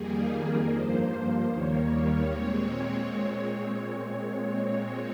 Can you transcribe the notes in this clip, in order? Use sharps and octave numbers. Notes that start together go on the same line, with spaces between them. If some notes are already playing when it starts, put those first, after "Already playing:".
Already playing: F2 D#3 G3 A#3 G#4
G2 F3 A#3 C5
D#2 D#3 G3 A#3 C#5
A#2 G#3 C4 C#5